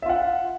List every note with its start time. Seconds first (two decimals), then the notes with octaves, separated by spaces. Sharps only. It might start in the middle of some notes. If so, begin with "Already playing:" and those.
0.02 E5
0.06 F4
0.09 F#5